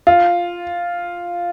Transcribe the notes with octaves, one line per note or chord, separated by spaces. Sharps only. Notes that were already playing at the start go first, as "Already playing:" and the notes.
F4